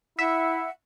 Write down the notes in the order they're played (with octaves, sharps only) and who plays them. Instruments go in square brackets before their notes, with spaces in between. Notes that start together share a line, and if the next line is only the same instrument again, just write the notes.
[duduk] E4 [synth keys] E5 [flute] F#5